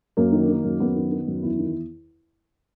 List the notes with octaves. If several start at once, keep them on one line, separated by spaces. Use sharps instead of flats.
F#2 A#3
D#3
D#3
F#2
F#2 B3
D#3
D#3
F#2
E2 E4
D#3